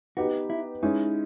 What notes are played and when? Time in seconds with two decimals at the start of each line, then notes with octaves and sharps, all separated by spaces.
0.17 B3 D#4 F#4 G4 B4
0.50 E4
0.82 G#3 C#4 D#4 E4